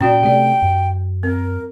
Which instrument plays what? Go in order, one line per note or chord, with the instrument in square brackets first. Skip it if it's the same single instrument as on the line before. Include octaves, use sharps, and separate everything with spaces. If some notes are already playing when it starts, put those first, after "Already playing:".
[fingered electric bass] A#2 [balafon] C#4 F#4 D5 [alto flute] G5
[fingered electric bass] C3 A3 [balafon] G4 D5
[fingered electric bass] F#2
[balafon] C4 [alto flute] A#4